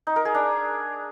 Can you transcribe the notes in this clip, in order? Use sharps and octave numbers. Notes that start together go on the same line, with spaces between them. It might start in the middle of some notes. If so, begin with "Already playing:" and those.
D#4
A#4
G#4
D4